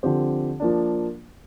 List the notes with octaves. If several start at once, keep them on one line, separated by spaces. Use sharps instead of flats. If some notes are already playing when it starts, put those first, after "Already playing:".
D3 F3 C4 G4 C5
F3 A#3 D4